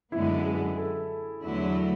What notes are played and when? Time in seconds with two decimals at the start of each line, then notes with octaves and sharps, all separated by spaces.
0.12 F#2 D3 G#3 B3 E4
0.46 G#4
0.78 A4
1.42 E2 D3 F#3 A3 E4